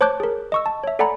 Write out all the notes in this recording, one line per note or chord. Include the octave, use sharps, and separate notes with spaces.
C5 C#5 A5 D6 F#6 G6
G#4 A#4
D#5 C#6 E6
A5
C#5 E5
A4 D5 F#5 G#5 A#5 B5